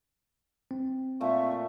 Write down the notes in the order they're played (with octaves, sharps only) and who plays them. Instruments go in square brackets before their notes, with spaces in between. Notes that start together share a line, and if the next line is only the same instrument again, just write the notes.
[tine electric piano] C4
[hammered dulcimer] A#2 A3 [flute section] E5 C#6